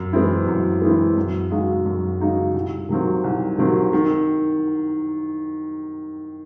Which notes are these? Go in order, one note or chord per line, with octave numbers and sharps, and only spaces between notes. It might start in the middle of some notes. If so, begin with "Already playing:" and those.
Already playing: F#2
E3 G#3 C4 E4
F#2
E3 G#3 C4 E4
F#2
C#3 G#3 D#4 F#4
F#2
C#3 G#3 D#4 F#4
C2
C3 D#3 F#3 C4
C2
C3 D#3 F#3 C4
D#3